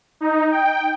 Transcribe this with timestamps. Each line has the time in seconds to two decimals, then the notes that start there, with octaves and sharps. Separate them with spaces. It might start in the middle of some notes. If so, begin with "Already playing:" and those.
0.21 D#4
0.52 G5